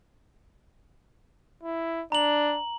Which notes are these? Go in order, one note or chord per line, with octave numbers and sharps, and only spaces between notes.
E4
D4 A#5 F#7